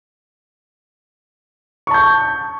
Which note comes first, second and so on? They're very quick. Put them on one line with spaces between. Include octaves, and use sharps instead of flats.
C#6 A5 G6